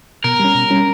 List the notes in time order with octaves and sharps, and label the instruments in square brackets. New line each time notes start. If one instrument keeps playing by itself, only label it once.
[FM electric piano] B2 [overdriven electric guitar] A#4
[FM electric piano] G3 C#4
B2
G3 C#4